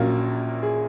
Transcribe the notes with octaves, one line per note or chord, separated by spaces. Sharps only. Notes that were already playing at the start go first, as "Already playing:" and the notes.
Already playing: A#1 A#2 F#3 A#3 C#4 A#4
G#4